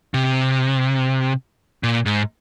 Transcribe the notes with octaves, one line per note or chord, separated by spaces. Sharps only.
C3
A#2
G#2